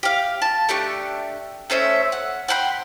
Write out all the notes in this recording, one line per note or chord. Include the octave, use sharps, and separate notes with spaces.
G4 F5
A5
A3 D4 G4 C#6
A3 C#4 C5 E5
F#5
F#5 G5 B5 C6